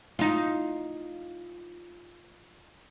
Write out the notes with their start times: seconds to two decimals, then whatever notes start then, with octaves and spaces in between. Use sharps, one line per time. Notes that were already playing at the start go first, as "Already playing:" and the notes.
0.19 D#4 F4